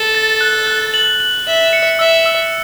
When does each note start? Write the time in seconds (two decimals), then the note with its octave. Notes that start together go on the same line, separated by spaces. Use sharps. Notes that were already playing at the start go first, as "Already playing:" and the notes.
Already playing: A4
0.15 A6
0.41 F#6
0.67 F#6
0.94 F#7
1.20 F#7
1.47 E5 F#7
1.73 C#7
1.99 E5 E6
2.26 E6